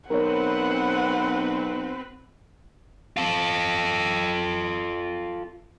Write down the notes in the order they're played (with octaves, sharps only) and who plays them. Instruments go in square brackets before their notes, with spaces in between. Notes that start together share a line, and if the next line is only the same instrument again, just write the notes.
[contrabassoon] B1 [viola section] C4 B4 [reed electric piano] A#4 C#5 [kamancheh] F#5
[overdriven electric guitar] F4 A4